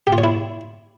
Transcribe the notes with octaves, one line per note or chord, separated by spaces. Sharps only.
G4
F4
C#5
E4